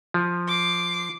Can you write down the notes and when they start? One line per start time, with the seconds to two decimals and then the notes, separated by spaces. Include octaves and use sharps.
0.14 F3
0.48 D6 C7